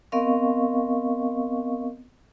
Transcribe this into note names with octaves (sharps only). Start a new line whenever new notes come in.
B3 C4 A#4 D#5 F5 C#6